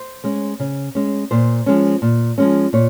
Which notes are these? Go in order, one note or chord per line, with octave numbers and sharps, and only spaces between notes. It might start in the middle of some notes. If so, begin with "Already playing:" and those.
Already playing: C5
G#3 C#4
C#3
G#3 C#4
A#2 C5
F3 G#3 C#4
A#2
F3 G#3 C#4
A#2 C#5